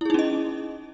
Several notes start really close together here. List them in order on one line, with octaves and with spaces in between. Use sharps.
E4 G#4 D#4 C#4 D#5